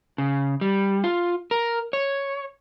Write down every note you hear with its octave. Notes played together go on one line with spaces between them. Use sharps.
C#3
G3
F4
A#4
C#5